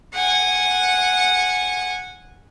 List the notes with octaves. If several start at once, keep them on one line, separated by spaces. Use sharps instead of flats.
F#5 G#5